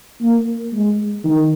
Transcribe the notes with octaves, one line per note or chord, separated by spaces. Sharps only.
A#3
G#3
D#3